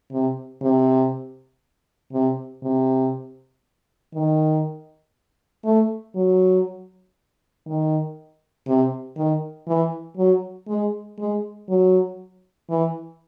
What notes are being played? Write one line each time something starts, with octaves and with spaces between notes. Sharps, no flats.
C3
C3
C3
C3
D#3
A3
F#3
D#3
C3
D#3
E3
F#3
G#3
G#3
F#3
E3